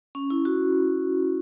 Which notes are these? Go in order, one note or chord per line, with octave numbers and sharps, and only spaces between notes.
C#4
E4
F#4